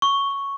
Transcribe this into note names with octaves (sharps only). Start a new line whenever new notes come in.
C#6